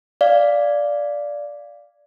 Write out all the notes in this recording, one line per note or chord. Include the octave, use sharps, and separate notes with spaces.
D5 F5